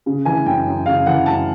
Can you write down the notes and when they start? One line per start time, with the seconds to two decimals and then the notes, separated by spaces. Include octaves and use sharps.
0.06 C#3
0.25 E3 G#5
0.45 F#2 G5
0.66 F#2
0.86 C#3 F5
1.06 E3 F#5
1.26 F#2 A5